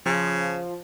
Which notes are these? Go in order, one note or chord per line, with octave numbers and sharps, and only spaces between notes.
C#3 F3